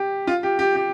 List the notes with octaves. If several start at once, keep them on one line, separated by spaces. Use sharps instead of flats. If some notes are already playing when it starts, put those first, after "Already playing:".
Already playing: G4
F4
G4
G4
G4